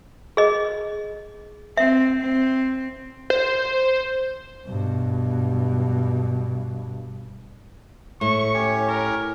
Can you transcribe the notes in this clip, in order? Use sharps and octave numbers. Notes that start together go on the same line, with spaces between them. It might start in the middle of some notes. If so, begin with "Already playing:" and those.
G#4 D#5
C4 E5
C4
C5
G2 B2
A2 C#6
C#4 G4 C#5
A#4